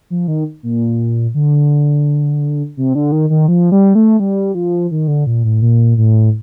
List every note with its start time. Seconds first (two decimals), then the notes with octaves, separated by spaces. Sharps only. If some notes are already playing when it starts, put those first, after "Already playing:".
0.10 F3
0.28 D#3
0.63 A#2
1.34 D3
2.77 C3
2.95 D3
3.12 D#3
3.30 D#3
3.48 F3
3.72 G3
3.95 A3
4.20 G3
4.55 F3
4.91 D#3
5.08 D3
5.27 A#2
5.44 A2
5.62 A#2
5.97 A2